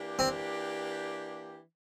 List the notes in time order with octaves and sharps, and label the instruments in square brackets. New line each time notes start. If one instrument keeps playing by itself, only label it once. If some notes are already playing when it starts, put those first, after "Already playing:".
Already playing: [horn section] E3 A#3 D4 G4
[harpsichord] C4